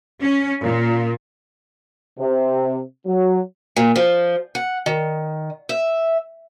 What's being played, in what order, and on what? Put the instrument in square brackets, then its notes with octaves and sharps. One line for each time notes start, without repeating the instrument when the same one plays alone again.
[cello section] C#4
A#2
[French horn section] C3
F#3
[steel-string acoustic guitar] A#2
F3
F#5
D#3
E5